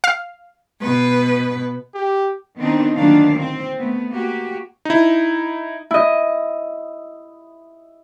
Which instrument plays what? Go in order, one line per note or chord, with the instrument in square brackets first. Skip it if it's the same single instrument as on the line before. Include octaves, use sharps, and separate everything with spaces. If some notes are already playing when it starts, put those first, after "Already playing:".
[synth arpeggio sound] F5
[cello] B2 B4
[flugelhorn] G4
[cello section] D#3 B3 C4 D4 D#4
D2 A#2 D#3 F#3 D4 F5
C4
A3 B3
A#3 F#4 G4
[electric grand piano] D#4 E4
[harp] E4 D#5